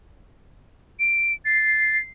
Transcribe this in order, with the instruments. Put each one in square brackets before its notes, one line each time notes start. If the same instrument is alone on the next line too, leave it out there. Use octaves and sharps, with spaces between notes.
[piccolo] D7
[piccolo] A6 [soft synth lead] C7